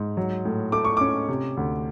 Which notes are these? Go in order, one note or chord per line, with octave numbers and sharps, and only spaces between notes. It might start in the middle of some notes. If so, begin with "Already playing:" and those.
Already playing: G#2
F#3
A2
A3 D6
C#6
C#4 D6
C3
D2